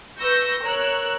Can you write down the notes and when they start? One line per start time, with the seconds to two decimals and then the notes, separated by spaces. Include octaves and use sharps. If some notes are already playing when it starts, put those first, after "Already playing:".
0.19 B4 C#6 E6 G6 A#6
0.62 A#4 C#5 E6 F#6